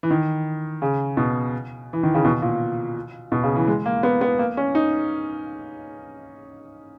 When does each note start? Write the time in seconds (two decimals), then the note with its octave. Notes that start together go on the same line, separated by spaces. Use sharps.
0.03 E3
0.11 D#3
0.82 C#3
1.17 B2
1.93 E3
2.03 D#3
2.14 C#3
2.25 B2
2.42 A#2
3.32 B2
3.43 C#3
3.55 E3
3.67 G#3
3.86 A#3
4.03 B3
4.21 B3
4.39 A#3
4.57 C#4
4.75 D#4